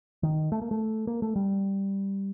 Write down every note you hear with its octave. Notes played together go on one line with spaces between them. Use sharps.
D#3
A3
A#3
A3
A#3
A3
G3